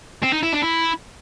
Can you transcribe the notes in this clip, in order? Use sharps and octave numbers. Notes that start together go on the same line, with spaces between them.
C4
D#4
E4
D4
E4